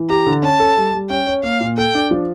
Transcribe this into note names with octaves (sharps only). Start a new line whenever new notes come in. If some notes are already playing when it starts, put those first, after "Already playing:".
Already playing: E3
G4 A#5
D3
C#4 A5
A4
G3
G3
C#4 G5
C#5
A#3 F5
A#2
A4 G5
D4
F3